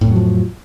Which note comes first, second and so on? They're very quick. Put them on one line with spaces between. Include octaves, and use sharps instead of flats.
A2 F2 F#3 F3